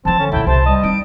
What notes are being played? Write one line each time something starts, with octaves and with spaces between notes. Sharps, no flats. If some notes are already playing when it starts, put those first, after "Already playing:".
E3 F3 C4 A5
D3 C#4
E2 A#2 E4 G5
C2 C3 C5 A5
G3 D#5
C4 D#4 D7